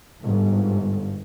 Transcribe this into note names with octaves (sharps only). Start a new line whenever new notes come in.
G1 G#2